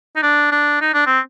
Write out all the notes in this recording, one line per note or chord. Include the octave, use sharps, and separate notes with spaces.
D#4
D4
D4
D#4
D4
C4